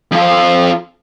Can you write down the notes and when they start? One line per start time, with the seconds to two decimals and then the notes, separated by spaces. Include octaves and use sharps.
0.12 F2 F4